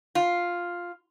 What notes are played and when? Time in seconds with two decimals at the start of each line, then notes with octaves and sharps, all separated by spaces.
0.15 F4